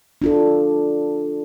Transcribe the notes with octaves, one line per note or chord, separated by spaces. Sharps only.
D4 F4 A4